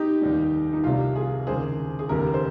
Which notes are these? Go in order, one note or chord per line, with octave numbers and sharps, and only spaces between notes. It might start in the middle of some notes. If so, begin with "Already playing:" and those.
Already playing: D#4 G4
F1 D#2 D#3 G3
D#4
C2 C3 G3 F4
F4 G#4
D#2 C#3 G#3 G#4 C5
G#4
F1 D#2 C#3 G4 A#4
C5